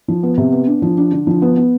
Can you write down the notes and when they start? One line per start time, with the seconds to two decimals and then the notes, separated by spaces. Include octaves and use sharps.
0.08 F3
0.23 B3
0.38 C3
0.52 B3
0.67 D4
0.82 F3
0.97 D4
1.12 D3
1.27 F3
1.42 B3
1.57 B3